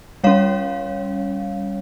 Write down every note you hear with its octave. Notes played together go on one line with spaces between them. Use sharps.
G3 C#4 C#5 F5